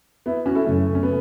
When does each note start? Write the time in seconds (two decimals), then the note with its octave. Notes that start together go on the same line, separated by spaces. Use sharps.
0.26 B3 E4
0.46 C#4 F#4
0.55 E4 A4
0.64 F#2 C#3 F#3 A3 C#4
0.95 C#4
1.03 B3